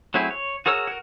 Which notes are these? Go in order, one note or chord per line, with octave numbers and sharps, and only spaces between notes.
F#3 A3 C4 E4 G#4
C#5
F#4 G#4 A#4 C#5 E6
F#4 A#4